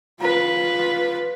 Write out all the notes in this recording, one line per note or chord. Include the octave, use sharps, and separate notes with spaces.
F4 B4